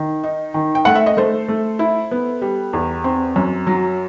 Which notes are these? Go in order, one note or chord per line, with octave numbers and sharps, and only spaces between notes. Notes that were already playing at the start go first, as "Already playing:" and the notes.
Already playing: D#3
D#4
D#3
G5
A3 F#5
E5
D#5
A3 A4 C5
A3
E4
B3
G3
E2
C4
F#2
F#3